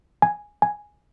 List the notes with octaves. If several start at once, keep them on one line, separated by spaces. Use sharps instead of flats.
G#5
G#5